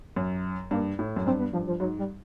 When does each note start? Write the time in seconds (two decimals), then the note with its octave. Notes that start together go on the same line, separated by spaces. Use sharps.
0.16 F#2
0.71 G2 A#3
0.99 A2
1.16 F#2
1.26 G2 C4
1.39 B3
1.53 G2 F3
1.67 F3
1.80 G#2 F#3
1.99 G3